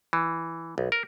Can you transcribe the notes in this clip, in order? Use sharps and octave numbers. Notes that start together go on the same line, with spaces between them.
E3
B1
A#4